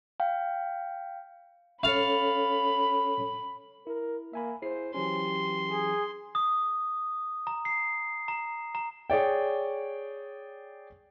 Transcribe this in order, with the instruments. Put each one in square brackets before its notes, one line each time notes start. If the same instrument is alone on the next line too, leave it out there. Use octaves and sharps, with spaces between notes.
[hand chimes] F5 G5
[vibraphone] C#4 A4 C#5 [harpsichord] F5 [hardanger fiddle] B5
[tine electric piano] E4 [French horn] A#4
[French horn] A#3 [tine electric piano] E5 G#5 B5
[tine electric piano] E4 G#4 C7 [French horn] C5
[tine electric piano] E3 F#3 C#4 [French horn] G4 [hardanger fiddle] C6
[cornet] G#4
[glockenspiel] D#6
A#5
C7
A#5
A#5
[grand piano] G#4 C#5 D5 G5